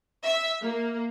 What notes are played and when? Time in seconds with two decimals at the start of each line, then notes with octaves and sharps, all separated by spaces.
0.24 E5
0.62 A#3